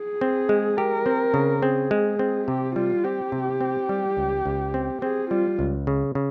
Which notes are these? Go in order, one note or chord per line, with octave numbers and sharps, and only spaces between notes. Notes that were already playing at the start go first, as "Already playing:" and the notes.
Already playing: G#4
C4
G#3
G4 A#4
C4
C#3
C4 G#4
G#3
C4
C3 G4
G3 F4
C4 G4
C3
C4
G3
C#2
C#2
C4
C4 G#4
G3 F4
C#2
C#3
C#3